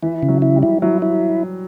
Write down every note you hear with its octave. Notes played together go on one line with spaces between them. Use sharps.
E3 E4
C#3
F#3
E4
G3
E4
F#3 E4
E4